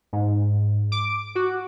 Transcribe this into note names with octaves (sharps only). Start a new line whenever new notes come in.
G#2
D6
F#4